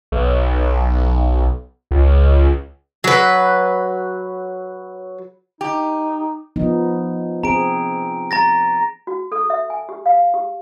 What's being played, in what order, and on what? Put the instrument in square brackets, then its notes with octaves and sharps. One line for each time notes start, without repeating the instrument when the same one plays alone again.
[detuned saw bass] B1
C#2
[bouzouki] F#3 B4
[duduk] D#4 [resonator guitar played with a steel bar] G4
[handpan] F3 B3 D#4
[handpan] C4 G#4 [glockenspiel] A#5 D7
[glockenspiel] A#5 A6 A#6
[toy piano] F#4
A4
E5
G#5
G4
F5
G4